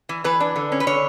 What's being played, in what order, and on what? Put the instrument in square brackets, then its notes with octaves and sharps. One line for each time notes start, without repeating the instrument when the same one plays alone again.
[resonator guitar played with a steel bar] E3
E3 B4
D4
D3
C#4
B4
D3 C#5